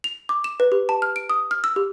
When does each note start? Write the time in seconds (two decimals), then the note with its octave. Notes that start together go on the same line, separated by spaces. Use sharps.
0.04 F7
0.29 D6
0.44 E7
0.60 B4
0.72 G4
0.89 A5
1.02 F6
1.16 D7
1.30 D#6
1.51 F6
1.64 E6
1.76 G4